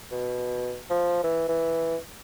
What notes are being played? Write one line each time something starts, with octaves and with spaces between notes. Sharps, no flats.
B2
F3
E3
E3